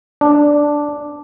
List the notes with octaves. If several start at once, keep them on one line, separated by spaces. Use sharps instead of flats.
D4